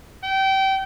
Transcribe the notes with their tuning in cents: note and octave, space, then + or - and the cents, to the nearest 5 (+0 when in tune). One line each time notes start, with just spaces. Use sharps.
G5 -25